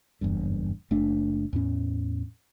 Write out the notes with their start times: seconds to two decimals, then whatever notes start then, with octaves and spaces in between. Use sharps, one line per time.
0.21 F#1 E2 G2
0.91 F#1 A3 D4
1.53 E2 A2 C#4